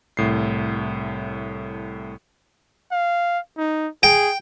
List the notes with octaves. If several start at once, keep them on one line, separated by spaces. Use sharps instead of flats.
C2 A2 C7
F5
D#4
G#4 G5